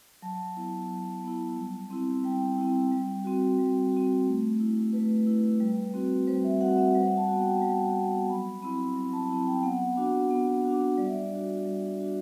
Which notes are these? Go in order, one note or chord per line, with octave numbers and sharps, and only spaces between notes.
F#3 A5
B3 E4
F#3
B3 E4
G3
C4 E4
G3 G5
C4 E4
G3
C4 F#4
G3
C4 F#4
A3
E4
A3 B4
E4
G3
C4 F#4
G3 C5
E5
C4 F#4 F#5
E5
G3 F#5
A5
B3 F#4
G5
A5
G3 G5
B3 F#4
F#3 B5
C4 E4 B5
F#3 B5
A5
C4 E4 A5
G5
B3 F#5
D4 F#4
B3
D4 F#4
G3 D5
E5
D5
D4 F#4
G3
D4 F#4